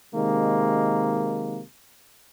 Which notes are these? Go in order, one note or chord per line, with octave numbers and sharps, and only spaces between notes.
C3 D#3 G#3 A#3